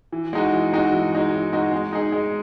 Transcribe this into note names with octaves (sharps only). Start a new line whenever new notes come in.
E3
G#3 D#4 F#4
E3
G#3 D#4 F#4
E3
G#3 D#4 F#4
E3
G#3 D#4 F#4
G#3
D#4 G#4
G#3